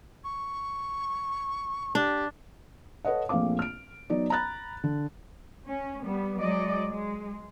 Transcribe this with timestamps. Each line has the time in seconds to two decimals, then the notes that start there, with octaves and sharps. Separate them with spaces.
0.23 C#6
1.95 D4 G4
3.05 A4 B4 C#5 D#5 F#5
3.29 A#1 A#2 A3 C4 F5 D6
3.59 F6 D7
4.10 F#3 B3 D#4 D5
4.30 A#5 B5 F#6 A6
4.84 D3
5.68 C#4
6.05 G3 B3
6.40 F#3 G#3 D5 D#5
6.88 G#3